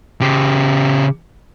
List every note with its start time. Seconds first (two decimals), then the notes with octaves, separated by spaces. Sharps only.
0.21 C#3 G4